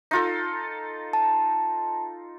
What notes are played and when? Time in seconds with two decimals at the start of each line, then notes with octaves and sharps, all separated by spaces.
0.11 D#4 F4 A4
1.13 A5